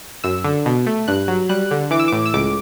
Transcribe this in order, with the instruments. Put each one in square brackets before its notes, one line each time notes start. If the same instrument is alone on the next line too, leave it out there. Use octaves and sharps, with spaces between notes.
[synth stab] F#2 E6
D3
B2
A3
G2 F#6
F#3
G3 F#6
D3
E3 D6
E6
A2 D6
E6
C#2 D6